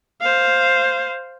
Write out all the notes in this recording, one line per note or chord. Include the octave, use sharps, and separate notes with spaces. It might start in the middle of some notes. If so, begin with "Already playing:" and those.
C5 F5